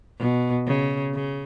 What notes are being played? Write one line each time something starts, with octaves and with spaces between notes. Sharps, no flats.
B2
C#3
C#3